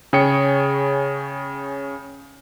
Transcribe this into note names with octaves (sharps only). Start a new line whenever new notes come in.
C#3 G#4 C#5 G5 C#7